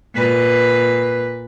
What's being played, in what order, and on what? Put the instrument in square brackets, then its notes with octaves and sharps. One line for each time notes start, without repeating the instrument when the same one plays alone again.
[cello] A#2 B4